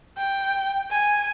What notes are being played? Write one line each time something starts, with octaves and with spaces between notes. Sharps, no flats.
G5
G#5